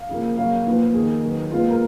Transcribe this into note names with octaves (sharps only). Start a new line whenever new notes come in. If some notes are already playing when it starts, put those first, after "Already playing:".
Already playing: F5
C#3 F3 A#3
C#3 F#3 A#3 F5
A#2 F3 B3
D#3 A#3 G#4
D#3 F#3 B3
A#2 G#3 B3 F4
A#4